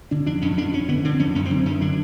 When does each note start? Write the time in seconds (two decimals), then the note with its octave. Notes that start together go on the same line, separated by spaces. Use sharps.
0.11 D3 D4
0.26 F2 D4
0.42 F2 C#4
0.58 F2 D4
0.73 F2 C#4
0.88 D3 B3
1.05 D3 C4
1.19 F2 C#4
1.35 F#2 C#4
1.45 C4
1.51 D3
1.66 F#2 C#4
1.81 D3 D4